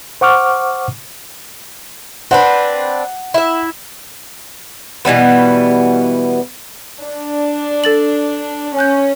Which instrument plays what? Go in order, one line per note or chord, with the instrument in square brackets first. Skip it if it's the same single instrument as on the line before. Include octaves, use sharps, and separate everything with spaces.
[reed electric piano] C5 F#5 C#6 D6 F6
[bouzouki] C4 D4 B4 [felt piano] F#5
[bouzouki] E4 E5
B2 E3 G3 B3
[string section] D4
[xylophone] A4 A6 F#7
[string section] C#4 [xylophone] G#5 F#6 G6